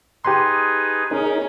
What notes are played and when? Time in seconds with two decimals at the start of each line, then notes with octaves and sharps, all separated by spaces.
0.25 D#4 G4 G#4 B4 C6
1.11 C#4 D#4 G#4 A#4